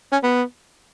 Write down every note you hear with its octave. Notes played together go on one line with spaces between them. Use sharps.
C#4
B3